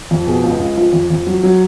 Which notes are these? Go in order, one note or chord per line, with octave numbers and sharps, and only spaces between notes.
F2
B2 G#4
C#2
C#2
F3
F2
F2
F#3
F#3